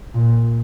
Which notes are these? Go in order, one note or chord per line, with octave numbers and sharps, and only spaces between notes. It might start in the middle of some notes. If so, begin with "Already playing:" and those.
A#2